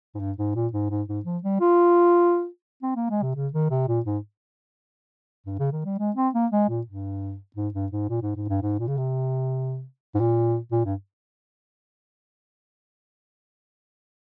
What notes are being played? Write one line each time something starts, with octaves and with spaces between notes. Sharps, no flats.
G#2
G2
G#2
A#2
G#2
G#2
G#2
F3
G3
F4
C4
A#3
G#3
C3
C#3
D#3
C3
A#2
G#2
G2
C#3
D#3
G3
G#3
C4
A#3
G#3
A#2
G2
G#2
G2
G#2
A#2
G#2
G#2
G2
G#2
A#2
C#3
C3
G#2
A#2
A#2
G2